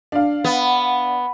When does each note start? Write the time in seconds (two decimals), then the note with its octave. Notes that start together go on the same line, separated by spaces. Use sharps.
0.12 D4 F5
0.44 B3